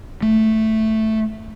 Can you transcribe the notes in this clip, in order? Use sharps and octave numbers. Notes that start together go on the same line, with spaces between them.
A3